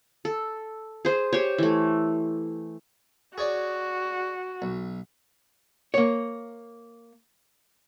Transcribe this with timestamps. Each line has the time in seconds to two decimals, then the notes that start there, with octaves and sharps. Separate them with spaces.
0.25 A4
1.05 G#4 C5
1.33 G4 C5 C#5
1.58 E3 A3
3.38 F#4 G#4 C#5 D5
4.62 B1
5.94 A#3 C#5